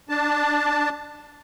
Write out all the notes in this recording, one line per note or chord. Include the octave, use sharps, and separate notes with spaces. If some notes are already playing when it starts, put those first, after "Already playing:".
D4 A5